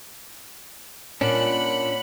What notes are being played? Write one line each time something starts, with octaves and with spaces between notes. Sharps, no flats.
A#2 C#4 D4 F#5 B5